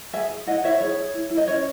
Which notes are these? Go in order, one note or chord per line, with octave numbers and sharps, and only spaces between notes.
G#4 E5 G#5
G#4
E4 D#5 F#5
E4 C#5 E5
G#4 C#5
G#4
E4
E4
D#5
C#4 C#5